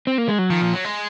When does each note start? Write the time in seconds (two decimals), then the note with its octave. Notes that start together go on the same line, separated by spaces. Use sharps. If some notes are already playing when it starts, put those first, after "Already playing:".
0.07 C4
0.18 A#3
0.29 G#3
0.39 F#3
0.50 D#3 F3
0.62 A#2
0.73 F#3
0.84 G#3